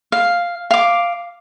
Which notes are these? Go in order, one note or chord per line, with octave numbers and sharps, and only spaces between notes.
F5
F5 D6